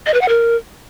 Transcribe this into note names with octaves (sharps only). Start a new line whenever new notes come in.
D#5
B4
F#5
A#4